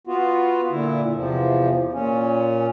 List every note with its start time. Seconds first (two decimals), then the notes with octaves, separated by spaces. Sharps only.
0.07 B3 F4 F#4
0.70 A#2 D3 E4
1.14 E2 C3 F3
1.93 A#2 C#4